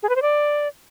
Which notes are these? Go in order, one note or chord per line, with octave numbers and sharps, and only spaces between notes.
G#4
B4
C5
D5